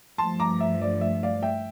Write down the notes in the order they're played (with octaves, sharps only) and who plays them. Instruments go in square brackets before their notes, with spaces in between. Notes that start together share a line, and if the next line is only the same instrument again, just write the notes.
[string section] G2 F3 A3 [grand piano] A5 C6
[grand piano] A#5 D6
E5
D5
E5
D5 F5
E5 G5